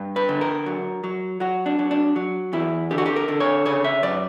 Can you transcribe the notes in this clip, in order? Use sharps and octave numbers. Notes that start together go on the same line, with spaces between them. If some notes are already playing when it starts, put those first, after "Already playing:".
Already playing: G2
B4
D3
A#4
F#3
F#3
F#3 F#4
D4
F#3
D4
F#3
E2 E4
D3 G4
F#4
G4
A#4
D3
C#5
C#3 C#5
E5
F#2 D5